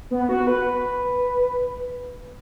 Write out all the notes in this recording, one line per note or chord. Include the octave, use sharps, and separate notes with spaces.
B3
F#4
B4